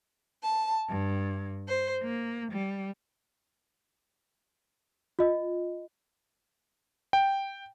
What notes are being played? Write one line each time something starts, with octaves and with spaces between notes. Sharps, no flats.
A5
G2
C5
A#3
G3
F4 D#5
G5